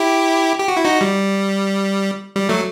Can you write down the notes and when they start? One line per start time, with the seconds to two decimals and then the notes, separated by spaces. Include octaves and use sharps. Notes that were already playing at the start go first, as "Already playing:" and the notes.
Already playing: E4 G4
0.60 G4
0.68 F#4
0.77 E4
0.85 D#4 F#4
1.01 G3
2.36 G3
2.49 F#3 A3